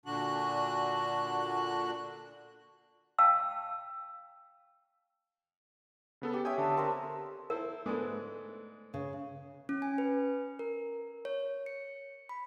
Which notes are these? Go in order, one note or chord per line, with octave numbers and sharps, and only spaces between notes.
A#2 D3 D4 F#4 F#6
F5 G5 A5 E6
C#3 B3 A4
G4
C#5 E5 G5 G#5 D#6
D3 A5
C4 A#4 E5
E4 A4 A#4 C5
G#2 G#3 A3 D4 B4 C5
C#3
C#4
G#5
B4
A#4
C#5
C#7
B5